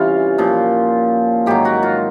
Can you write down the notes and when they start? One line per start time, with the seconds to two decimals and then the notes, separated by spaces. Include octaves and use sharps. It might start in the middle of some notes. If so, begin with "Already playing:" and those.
Already playing: C3 E3 G3 C#4 F4
0.38 A#2 F3
1.46 G#2 D#3 F#3 G4
1.65 F#4
1.83 F4